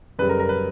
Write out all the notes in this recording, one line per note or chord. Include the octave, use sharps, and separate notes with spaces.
F#2 C#3 G3 B4
A#4
A#4
B4